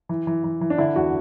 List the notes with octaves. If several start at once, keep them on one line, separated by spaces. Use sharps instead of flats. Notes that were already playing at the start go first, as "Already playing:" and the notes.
E3
E3
E3
E3
D4
D3 E4
E2 F#4